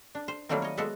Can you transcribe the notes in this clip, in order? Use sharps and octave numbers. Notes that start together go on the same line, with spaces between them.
D4
C5
D#3 F#3 G3 A3 A#3 C4
C#5 D#5
G#3 B3 F#4 A4 E5 F#5